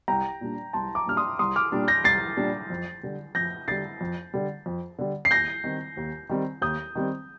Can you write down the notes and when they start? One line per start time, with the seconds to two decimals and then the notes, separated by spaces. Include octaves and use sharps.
0.08 C2 G5 A#5
0.41 A#2 G3 D4
0.73 C2 A5 C6
0.95 A#5 D6
1.06 A#2 G3 D4 F6
1.17 C6 D#6
1.39 C2 C6 D#6
1.56 D6 F6
1.72 A#2 G3 D4
1.88 G6 A#6
2.04 C2 A6 C7
2.37 A#2 G3 D4
2.70 F2
3.03 D3 G3
3.35 F2 G6 A#6
3.68 D3 G3 A6 C7
4.01 F2
4.34 D3 G3
4.66 F2
4.99 D3 G3
5.25 C7
5.31 D#2 G6 A#6
5.64 D#3 G3 C4
5.97 D#2
6.29 D#3 G3 C4
6.62 D#2 D#6 G6
6.95 D#3 G3 C4